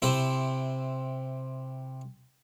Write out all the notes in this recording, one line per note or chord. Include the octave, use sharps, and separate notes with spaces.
C3 C4 E4